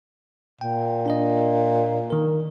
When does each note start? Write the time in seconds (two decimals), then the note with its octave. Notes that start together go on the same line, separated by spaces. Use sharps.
0.61 A#2 G5
1.06 D4 A#4 D#5
2.10 D#3 A#4